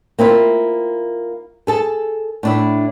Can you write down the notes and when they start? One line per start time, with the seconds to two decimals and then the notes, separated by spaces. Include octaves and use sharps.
0.19 A#3 C4 E4 F4
1.67 G#4 A4 A5
2.43 A2 D4 E4